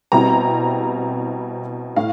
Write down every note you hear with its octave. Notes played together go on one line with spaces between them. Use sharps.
B2 G3 C4 E4 A#5
A2 F5